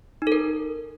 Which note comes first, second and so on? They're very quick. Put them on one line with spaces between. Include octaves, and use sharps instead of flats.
D#4 A4 A#4